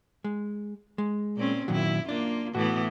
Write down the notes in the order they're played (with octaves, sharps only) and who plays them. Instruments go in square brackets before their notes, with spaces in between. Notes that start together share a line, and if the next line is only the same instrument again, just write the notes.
[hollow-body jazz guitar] G#3
G#3
[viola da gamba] A#2 C4 C#4
[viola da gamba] F#2 E4 [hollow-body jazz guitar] A#2 D#3 F#3
[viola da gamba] A#3 F4 [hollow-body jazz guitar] D4
[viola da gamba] A2 E3 B3 [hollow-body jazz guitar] F#4